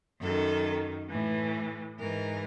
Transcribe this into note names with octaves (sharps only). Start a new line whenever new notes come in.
F#2 D#3 A4
A2 E3
G#2 E3 A#4